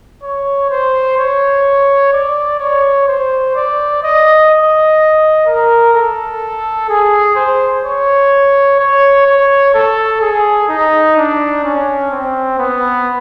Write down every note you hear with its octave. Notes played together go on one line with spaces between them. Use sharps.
C#5
C5
C#5
D5
C#5
C5
D5
D#5
D#5
A#4
A4
G#4
C5
C#5
C#5
C#5
A4
G#4
D#4
D4
C#4
C4
B3